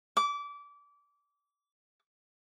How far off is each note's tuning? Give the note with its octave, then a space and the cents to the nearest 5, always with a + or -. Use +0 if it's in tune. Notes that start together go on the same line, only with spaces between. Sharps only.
D6 -25